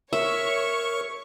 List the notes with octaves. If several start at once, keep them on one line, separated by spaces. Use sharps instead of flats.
A#4 C#5 E5 C#6